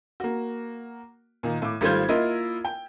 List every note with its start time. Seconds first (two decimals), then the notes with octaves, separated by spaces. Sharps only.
0.20 A#3 F#4
1.43 A#2 D#3
1.62 A2 D6
1.81 G#1 G3 A3 F4 C5 G#6
2.09 A#3 E4 F4 A#4 D#5
2.65 G5